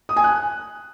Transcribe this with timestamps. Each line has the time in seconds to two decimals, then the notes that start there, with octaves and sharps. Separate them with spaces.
0.09 D#6
0.16 G#5
0.24 F#6